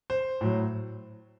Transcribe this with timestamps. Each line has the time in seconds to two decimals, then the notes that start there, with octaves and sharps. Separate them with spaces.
0.10 C5
0.41 A2 F#3